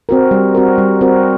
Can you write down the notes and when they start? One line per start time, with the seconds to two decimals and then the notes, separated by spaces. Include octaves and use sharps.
0.09 C4 F#4 A#4
0.31 G3
0.55 C4 F#4 A#4
0.78 G3
1.01 C4 F#4 A#4